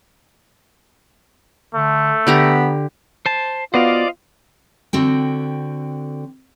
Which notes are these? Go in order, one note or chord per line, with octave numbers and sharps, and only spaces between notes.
D3 A3
D3 B3 G4 A#5
C5 A5
B3 F4 F#4 C5 D5 D#5 F5
D3 C4 F#4 G5